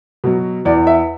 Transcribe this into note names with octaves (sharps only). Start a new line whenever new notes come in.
B2 F#3
E2 D5
E5